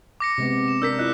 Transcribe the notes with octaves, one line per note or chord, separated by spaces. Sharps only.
D6 A#6 C#7
C3 G#3 B3
E7
D4 A#4 E6 G6 B6
E4 F4 D#5 F#6